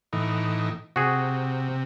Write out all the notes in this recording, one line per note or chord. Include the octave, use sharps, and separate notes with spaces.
A2 E3 D#4
C3 F#4 G#4